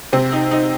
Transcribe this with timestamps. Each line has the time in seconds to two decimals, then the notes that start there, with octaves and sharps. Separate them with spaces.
0.13 C3 C4
0.32 D#4
0.51 D#4